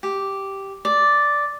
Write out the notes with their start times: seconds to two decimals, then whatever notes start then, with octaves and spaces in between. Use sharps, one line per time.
0.03 G4
0.85 D5